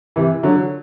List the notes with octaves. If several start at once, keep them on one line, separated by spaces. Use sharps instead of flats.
C3 E3
D3 F#3